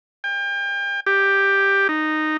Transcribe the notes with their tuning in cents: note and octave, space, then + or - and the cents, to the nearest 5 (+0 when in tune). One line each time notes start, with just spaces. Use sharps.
G5 +35
G4 +5
D#4 -10